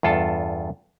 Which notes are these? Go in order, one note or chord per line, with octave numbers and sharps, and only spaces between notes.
E2 G2 F4 A4 A5